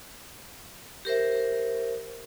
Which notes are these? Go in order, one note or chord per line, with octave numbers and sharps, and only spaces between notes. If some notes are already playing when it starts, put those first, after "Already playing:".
G4 A#4 C5 E5